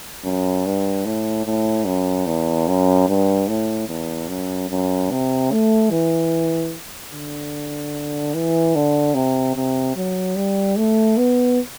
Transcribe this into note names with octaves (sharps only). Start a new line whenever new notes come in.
F#2
G2
A2
A2
F#2
E2
F#2
G2
A2
E2
F#2
F#2
C3
A3
E3
D3
E3
D3
C3
C3
F#3
G3
A3
B3